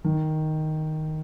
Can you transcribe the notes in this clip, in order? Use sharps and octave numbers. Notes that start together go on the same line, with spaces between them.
D#3